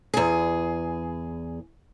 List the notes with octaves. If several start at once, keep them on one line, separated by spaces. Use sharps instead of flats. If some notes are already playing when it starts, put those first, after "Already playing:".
E2 G#4